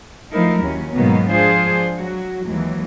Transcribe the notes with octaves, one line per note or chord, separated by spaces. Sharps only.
F3 A3 D#4 E4 A#4
D#2 F#3 C#4
G#2 B2 D#3 F#3 A#3 B3
F3 D4 F4 G#4 C5
F#3 F#4
D#2 E3 F#3 G#3